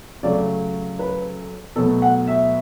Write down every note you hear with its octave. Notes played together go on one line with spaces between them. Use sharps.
C#3 F#3 A3 D5
B4
B2 F#3 A3 A4
F#5
E5